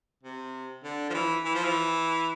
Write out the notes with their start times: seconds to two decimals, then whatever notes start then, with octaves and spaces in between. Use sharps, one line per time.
0.23 C3
0.84 D3
1.10 F3
1.14 E3
1.45 E3
1.55 F3
1.65 E3